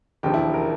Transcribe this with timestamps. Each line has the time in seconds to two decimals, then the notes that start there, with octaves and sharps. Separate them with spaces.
0.23 E1 D#2 D3 F3 G4
0.34 E4
0.54 A#4